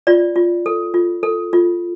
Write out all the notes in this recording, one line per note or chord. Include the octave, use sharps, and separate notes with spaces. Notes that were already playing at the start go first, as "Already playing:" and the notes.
F4 D5
F4
A4
F4
A4
F4